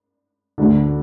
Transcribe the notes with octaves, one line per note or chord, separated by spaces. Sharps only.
D2 D3